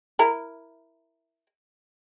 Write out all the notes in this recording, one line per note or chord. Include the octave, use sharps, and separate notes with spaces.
E4 A#4